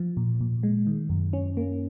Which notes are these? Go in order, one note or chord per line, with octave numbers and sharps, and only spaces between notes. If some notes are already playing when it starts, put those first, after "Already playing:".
Already playing: F3
A#2
A#2
G#3
D#3
F#2
C#4
A#3